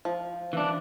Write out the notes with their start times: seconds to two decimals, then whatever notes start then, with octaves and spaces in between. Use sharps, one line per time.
0.05 F3
0.53 E3 D4